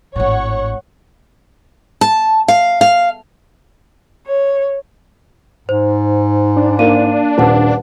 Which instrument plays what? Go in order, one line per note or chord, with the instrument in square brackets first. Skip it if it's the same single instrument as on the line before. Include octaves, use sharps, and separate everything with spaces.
[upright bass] G#1 A2 [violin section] C#5 F#5 C#6
[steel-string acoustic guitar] A5
F5
F5
[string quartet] C#5
[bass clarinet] G#2 [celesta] C5
[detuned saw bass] D4
[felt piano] A#3 [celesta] F5 D#7
[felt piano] D#1 [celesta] B4 F#5 A5